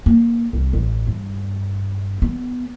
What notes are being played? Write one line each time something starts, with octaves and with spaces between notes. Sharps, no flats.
A#3
C2
A1
G2
B3